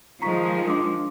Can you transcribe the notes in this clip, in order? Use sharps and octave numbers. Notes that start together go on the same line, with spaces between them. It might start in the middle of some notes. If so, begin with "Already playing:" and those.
D#3 F3 G#3 F4 A#5 C#6 B6
D4 C6 D6 D#6